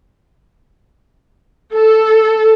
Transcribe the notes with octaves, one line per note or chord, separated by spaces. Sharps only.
A4